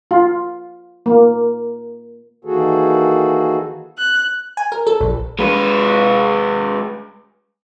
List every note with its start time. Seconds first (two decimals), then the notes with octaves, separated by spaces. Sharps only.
0.11 F4
1.06 A#3
2.45 D#3 E3 A#3 F#4 G#4 A4
3.98 F#6
4.57 G#5
4.72 A#4
4.87 A4
5.01 A#1
5.39 G#3 B4